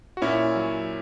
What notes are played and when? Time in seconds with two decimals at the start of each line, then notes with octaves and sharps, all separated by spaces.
0.17 F#4
0.22 A#2 C#4 E4
0.56 F#3